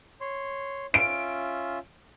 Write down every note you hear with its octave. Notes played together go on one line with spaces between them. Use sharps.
C#5 C6
C#4 F4 E5 D7